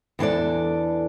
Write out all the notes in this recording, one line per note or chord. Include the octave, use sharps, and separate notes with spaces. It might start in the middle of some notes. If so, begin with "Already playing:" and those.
E2 E3 D4 A4 D5